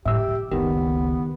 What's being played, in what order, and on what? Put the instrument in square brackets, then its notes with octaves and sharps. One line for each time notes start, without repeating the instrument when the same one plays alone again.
[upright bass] A2 F3 [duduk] G4 [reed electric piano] E5 E6
[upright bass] C3 E3
[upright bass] F#1 C#2 [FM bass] D#3 [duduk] B3 [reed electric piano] G4